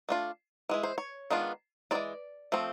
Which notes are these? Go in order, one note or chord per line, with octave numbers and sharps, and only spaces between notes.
A3 D4 F4
E3 G#3 E4
C5
C#5
D#3 G#3 B3 D4 F4
E3 G#3 C4 F4 D5
F3 A3 C4